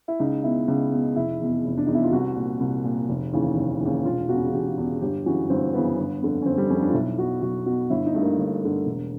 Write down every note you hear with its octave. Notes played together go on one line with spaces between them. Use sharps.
E4
C#2 D#4
B2 E4
C#2
B2
F1 E4
E2 B2
F1
D4
E2 B2 D#4
E4
F4
C2 F#4
A#2
C2
A#2
F1
D#2 C#3 E3
F1
D#2 C#3 E3
E1 F4
E2 C#3 F#4
E1 G4
E2 C#3
G1 G4
F#2 C#3 E3 F#4
G1 C4
F#2 C#3 E3 B3
G1
F2 D3
C#4
G1 C4
G3
F2 D3 C#4
D4
F4
B1 E4
B2 F#4
B1 F#4
B2 F#4
G1 E4
D#4
G2 D3 A3
A#3
G1
G2 D3
E1